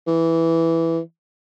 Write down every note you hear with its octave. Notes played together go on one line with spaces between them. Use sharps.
E3